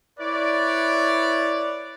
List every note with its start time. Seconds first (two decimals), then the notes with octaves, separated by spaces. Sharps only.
0.19 E4 B4 C#5 D5